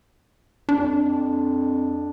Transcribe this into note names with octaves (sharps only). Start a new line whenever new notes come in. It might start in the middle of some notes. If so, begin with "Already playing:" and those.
F2 D4